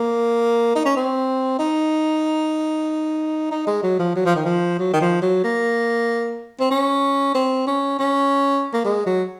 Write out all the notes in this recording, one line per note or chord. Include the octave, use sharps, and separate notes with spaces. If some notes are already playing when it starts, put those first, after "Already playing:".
Already playing: A#3
D#4
C#4
C4
D#4
D#4
G#3
F#3
F3
F#3
F3
D#3
F3
F#3
D#3
F3
F#3
A#3
C4
C#4
C4
C#4
C#4
A#3
G#3
F#3